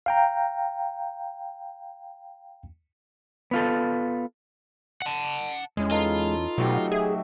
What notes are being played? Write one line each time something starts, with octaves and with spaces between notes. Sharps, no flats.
F5 G5 A#5
B3 F4 A4
F#5 A5
E2 E3 G#3 C#4
D#4 F4 A4 B4
B2 F#3 A3 D#4 F#4 G4
G#4 E5